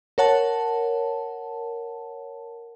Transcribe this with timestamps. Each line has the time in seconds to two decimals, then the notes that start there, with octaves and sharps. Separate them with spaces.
0.18 A#4 C#5 F#5 A5